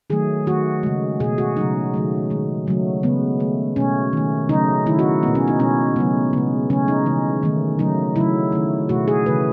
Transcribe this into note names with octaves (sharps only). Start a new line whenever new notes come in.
D#3 F#3 A3 G#4
D#3 A3 F#4
C#3 G#3
B2 A3 G#4
F#4
C#3 F#3 A3 D#4
D#3 F#3 A3
D#3 G#3
C#3 F#3 A3
C#3 G#3 B3
D#3 A3
B2 A3 C#4
D#3 A3
C#3 F#3 A3 D#4
D#3 A3 E4
F#4
B2 G#3 B3
C#4
D#4
B2 G#3 C#4
C#3 F#3 A3 B3
C#3 G#3 B3
C#3 F#3 A3 C#4
D#4
C#3 E3 G#3
D#3 A3
C#3 F#3 A3 D#4
C#3 F#3 A3 E4
D#3 A3
B2 A3 F#4
G#4
C#3 E3 A3 B4